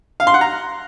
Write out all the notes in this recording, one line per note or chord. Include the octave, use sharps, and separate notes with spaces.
F5
C6
F#5
A#5